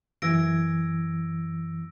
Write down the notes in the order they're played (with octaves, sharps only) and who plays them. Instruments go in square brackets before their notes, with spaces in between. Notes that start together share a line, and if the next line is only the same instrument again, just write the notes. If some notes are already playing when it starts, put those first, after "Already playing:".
[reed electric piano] F#2 E3 G#6 [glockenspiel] E6 A#6 D7